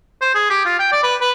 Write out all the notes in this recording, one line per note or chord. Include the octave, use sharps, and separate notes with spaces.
C5
G#4
G4
F4
G5
D5
B4
B4